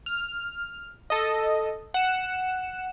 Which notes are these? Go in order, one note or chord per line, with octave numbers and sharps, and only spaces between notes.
F6
A4 D#5
F#5 E7